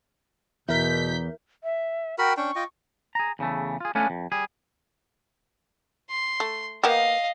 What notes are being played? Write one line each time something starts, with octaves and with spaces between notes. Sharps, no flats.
E2 B2 E4 A#4 G6 B6
E5
F#4 A#4 G5 B5
C#4 D4 G5 C#6
F4 D#5 G5
G#4 A#5
E2 C#3 E3 A3
F4 G#4
A3 B3 C#4 D4 F5 G#5
F2
G3 G#4
C6
A3
A#3 B3 G4 D#5 F5